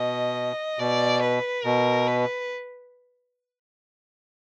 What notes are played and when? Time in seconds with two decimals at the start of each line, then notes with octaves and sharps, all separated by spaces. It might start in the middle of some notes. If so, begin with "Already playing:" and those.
Already playing: B2 D#5
0.79 B2 D5
1.21 B4
1.64 B2 A#4
2.08 B4